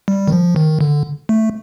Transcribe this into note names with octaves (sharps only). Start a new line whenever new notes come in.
G3
D#3
F3
D#3
D3
A3